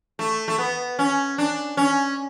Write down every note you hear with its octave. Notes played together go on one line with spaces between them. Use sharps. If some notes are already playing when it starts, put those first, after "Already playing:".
A3
A3
B3
C#4
D4
C#4